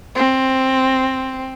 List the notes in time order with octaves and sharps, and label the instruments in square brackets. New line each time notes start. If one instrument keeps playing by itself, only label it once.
[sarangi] C4